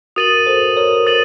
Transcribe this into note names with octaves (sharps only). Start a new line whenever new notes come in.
F#4 A#4 D#6 A6 D#7 F#7
A4 C5
A#4 C#5
D#6 A6 D#7 F#7